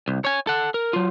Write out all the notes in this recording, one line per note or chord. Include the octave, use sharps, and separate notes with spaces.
C2
C#5 G#5
A4 F#5
A#4
F#3 F4